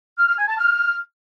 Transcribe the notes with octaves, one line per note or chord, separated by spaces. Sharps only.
F6
F6
G#5
A5
F6